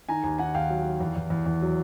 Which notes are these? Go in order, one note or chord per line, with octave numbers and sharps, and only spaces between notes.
D#3 G#5 A#5
D#2 G#5 A#5
D#3 F#5 G#5
D#2 F5 G5
F#3
F#3
E2
E2
E2
E2
F#3